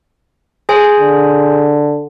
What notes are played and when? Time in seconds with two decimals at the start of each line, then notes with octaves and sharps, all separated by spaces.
0.69 G#4 C5 G#5
0.99 D3